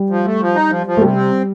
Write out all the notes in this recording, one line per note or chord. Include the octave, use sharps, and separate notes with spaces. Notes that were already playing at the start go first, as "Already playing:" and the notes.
Already playing: G3
F3
A3
F3
D#4
F3
F3
A3
C3 G3
C4